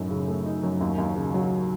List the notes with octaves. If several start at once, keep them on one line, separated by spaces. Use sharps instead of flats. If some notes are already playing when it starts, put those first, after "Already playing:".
Already playing: F#2 A2 D#4
C#3
A3
D#4
F#2
D#2
D#2
C#3
F#3